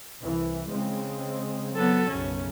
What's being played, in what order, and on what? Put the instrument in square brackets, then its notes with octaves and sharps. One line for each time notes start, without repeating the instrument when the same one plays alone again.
[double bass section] C2 E3
C#3 G#3 C4
[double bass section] F#3 [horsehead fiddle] B3 A4
[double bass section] B1 F#2 C#3 [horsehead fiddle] C#4